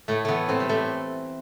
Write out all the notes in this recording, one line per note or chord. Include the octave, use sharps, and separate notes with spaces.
A2 A3
E3 A3 B3
A2 C4
G3
A2 A3